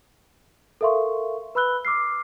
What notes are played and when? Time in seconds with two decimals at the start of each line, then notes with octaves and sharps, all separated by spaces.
0.81 A4 A#4 E5 F5 C6 C#6
1.55 B4 B5 E6 F#6 G7
1.85 D6 E6 F6 C7